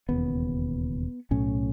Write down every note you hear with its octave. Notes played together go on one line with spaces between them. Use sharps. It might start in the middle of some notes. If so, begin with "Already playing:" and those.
E1 D#2 C#3 B3
B1 A2 C#4